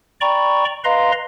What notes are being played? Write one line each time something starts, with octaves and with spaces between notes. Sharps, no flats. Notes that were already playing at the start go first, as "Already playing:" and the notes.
D5 G5 A#5 B5 C#6
B4 D#5 F5 A#5 C6